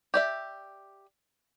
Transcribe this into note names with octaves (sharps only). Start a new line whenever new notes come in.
G4 D5 E5